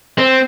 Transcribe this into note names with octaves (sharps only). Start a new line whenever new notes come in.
C4